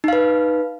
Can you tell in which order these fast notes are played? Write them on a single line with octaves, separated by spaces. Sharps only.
D#4 F5 B4